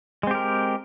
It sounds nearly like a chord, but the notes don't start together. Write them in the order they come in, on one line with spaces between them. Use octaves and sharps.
G#3 C4 G4 A#4